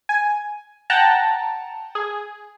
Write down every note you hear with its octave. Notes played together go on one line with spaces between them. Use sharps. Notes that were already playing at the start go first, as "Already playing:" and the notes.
G#5
F#5 G5 A5 A#5
G#4